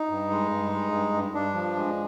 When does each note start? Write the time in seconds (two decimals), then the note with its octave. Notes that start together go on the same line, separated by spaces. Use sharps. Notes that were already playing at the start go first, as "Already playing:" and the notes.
Already playing: D#4
0.10 G2
0.30 G#3
0.51 G2
0.72 G#3
0.92 G2
1.14 G2
1.34 G2 D4
1.54 F3
1.76 G#3